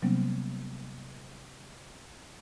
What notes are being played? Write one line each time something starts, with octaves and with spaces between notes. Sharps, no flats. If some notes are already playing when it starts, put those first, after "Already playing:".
C3 F#3 G3 A#3 B3 C#4